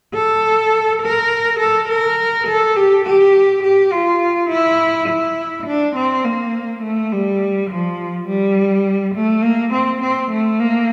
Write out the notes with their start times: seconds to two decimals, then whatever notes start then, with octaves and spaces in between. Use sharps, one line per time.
0.14 A4
1.02 A#4
1.59 A4
1.89 A#4
2.47 A4
2.76 G4
3.05 G4
3.63 G4
3.92 F4
4.50 E4
5.09 E4
5.66 D4
5.95 C4
6.25 A#3
6.83 A3
7.12 G3
7.70 F3
8.28 G3
9.15 A3
9.43 A#3
9.73 C4
10.02 C4
10.31 A3
10.60 A#3